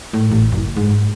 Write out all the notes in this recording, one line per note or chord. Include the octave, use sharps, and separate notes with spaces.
A2
A1
F#1
G#2